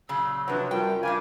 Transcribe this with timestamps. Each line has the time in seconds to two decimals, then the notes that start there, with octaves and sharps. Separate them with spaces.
0.09 A#2 C#3 F#3 E6
0.48 C3 F3 F#3 D4 B4
0.71 F#2 G3 F4 G5
1.03 C#3 A3 D4 F4 A#4 G#5 D6